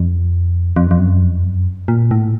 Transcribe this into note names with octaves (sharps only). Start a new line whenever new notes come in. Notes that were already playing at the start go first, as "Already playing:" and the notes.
Already playing: F2
F2
F2
F#2
F2
F#2
A#2
A2